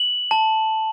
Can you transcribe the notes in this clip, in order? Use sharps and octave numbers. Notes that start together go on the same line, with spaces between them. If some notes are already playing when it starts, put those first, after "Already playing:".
Already playing: F#7
A5